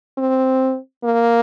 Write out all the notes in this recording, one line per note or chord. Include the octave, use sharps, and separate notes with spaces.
C4
A#3